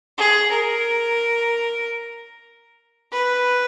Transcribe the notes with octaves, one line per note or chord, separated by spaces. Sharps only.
G#4
A#4
B4